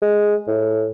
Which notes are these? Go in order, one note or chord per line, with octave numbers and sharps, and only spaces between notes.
G#3
A2